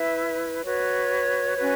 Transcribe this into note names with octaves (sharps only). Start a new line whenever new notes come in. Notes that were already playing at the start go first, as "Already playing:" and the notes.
Already playing: E4 B4 E5
F#4 B4 C#5
C#4 F#4 B4